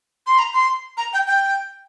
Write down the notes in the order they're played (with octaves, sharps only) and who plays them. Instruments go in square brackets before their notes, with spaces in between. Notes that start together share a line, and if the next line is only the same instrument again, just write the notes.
[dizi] C6
A#5
C6
A#5
G5
G5